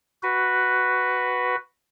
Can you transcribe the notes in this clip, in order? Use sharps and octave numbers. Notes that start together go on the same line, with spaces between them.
F#4 B4